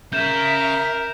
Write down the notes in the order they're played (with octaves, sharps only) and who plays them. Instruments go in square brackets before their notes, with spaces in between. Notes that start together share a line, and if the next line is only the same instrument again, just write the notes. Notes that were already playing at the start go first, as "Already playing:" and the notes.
[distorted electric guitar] C#3 [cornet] A#4 [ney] E5 [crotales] G6 E7